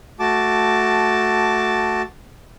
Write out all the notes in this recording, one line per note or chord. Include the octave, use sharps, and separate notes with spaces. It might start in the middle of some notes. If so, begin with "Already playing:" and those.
A3 F#4 A5 D6